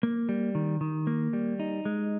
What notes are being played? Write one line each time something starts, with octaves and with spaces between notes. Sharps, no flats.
A#3
G3
D#3
D#3
A#3
G3
D#4
G#3